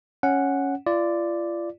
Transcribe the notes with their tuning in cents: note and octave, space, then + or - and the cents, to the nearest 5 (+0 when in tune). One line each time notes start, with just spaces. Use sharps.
C#4 +0 F#5 +0
F4 -35 D5 +0